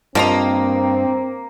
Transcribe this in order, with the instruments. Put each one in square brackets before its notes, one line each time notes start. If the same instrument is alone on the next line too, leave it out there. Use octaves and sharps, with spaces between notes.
[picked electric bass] G2 [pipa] F3 D#5 A#5 [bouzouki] A#3 [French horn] C4